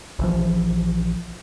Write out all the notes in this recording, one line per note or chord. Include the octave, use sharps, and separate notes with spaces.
A#1 E3 F3